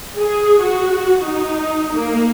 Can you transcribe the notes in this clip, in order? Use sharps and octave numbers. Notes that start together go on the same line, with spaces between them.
G#4
F#4
D#4
A#3